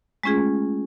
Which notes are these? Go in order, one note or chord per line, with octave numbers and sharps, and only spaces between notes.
G#3 A3 C#4 F4 G#4